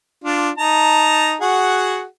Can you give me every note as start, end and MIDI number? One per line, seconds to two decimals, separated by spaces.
0.24 0.50 62
0.24 0.50 65
0.58 1.35 63
0.58 1.35 81
0.58 1.35 82
1.41 2.04 66
1.41 2.04 68
1.41 2.04 78